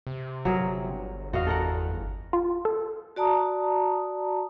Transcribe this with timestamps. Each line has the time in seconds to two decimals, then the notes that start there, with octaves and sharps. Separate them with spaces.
0.07 C3
0.45 G1 F#3 G#4 A#4
1.33 E2 F#4 D#5 F5
1.47 A4 A#4 F#5
2.33 F4
2.65 A4
3.16 F#4 D5 A5 A#5 D#6